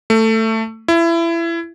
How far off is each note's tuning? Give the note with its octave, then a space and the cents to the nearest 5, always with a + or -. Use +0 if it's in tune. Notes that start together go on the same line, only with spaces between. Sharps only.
A3 +15
E4 +25